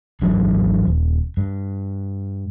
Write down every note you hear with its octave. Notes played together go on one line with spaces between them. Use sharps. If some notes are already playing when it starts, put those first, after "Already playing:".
G#1 E3 F#3 D4
D#1
G2